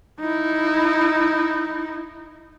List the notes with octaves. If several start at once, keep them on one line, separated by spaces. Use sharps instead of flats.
D#4 E4